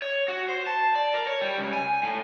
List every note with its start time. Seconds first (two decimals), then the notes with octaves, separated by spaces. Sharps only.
0.02 C#5
0.28 F#4
0.49 C5
0.67 A5
0.95 D5
1.14 A#4
1.27 C#5
1.41 G3
1.58 C#2
1.73 G#5
2.03 A2